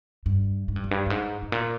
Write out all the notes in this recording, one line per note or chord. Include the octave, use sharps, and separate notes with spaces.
G2
G#2
G2
F2
G2
G2
G#2
G#2
A#2